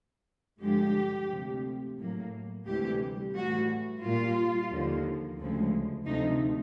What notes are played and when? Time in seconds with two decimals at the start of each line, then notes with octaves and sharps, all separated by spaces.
0.61 G2 D3 F3 G#3 G4
1.29 D2 C3 F3
1.97 A2 F#3 A#3
2.66 D2 C3 E3 G3 G4
3.34 A2 E3 G3 F#4
4.02 A#2 G3 A#3 F4
4.71 D#2 D3 F3 A#3
5.39 D2 C#3 F3 G#3
6.08 D2 C3 F3 A3 D#4